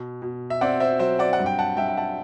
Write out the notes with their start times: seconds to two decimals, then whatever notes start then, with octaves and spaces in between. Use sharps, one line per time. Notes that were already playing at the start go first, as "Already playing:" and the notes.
Already playing: B2
0.22 B2
0.50 E5
0.61 C4 D5 F#5
0.80 C5 E5
0.99 F#3 C5 E5
1.19 D5 F#5
1.33 F#5
1.39 G2
1.46 G5
1.59 F#5 A5
1.77 G2 E5 G5
1.88 G5
1.97 F#5 A5